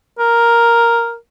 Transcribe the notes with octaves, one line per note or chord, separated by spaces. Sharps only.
A#4